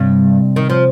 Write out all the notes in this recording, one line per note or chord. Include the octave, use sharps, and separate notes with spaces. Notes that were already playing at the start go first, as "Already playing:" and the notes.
Already playing: G2 C3
D#3
F3